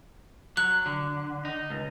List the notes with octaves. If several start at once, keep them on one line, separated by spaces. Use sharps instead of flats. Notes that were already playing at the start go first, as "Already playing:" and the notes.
F#3 F#6
D3
D#4
C#2